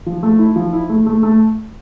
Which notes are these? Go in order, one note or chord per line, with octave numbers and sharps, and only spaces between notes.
F3
A3
E4
F3
E4
A3
A3
A3